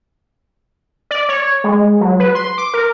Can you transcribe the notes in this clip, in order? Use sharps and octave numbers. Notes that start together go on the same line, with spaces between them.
D5
C#5
G#3
F#3
B4
C6
D6
A#4